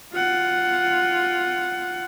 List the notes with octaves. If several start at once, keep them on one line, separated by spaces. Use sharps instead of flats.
F4 F#5